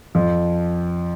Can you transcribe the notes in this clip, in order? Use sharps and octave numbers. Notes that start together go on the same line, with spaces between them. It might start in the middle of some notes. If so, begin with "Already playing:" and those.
F2 F3